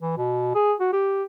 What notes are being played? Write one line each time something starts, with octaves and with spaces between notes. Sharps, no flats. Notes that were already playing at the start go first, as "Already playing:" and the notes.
E3
B2
G#4
F#4
G4